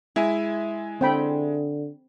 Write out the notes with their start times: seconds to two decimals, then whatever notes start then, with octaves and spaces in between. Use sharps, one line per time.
0.16 G#3 E4 E5 G#5
1.01 D3 C4 G5 B5